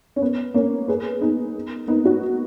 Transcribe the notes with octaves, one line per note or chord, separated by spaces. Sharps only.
C#4
B3
A#3 C#4
G#4 B4
B3 D#4
B3 D#4
D#4 F#4